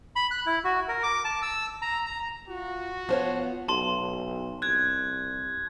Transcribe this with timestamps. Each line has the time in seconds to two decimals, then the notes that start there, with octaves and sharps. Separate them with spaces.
0.16 B5
0.31 F#6
0.46 E4
0.64 F#4
0.88 A#4
1.03 D6
1.25 A5
1.42 E6
1.82 A#5
2.06 A#5
2.48 F4 F#4
3.09 F3 B3 F4 C5 C#5 F5 F#5
3.68 B1 A5 C6
4.62 C2 F#6 G#6